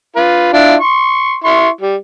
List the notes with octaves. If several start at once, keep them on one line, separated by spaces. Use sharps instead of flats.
F4 B4
D4 E4 F4
C6 C#6
E4 C6 C#6
G3